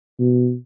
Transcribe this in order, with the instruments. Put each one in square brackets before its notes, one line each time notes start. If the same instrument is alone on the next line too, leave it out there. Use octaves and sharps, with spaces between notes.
[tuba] B2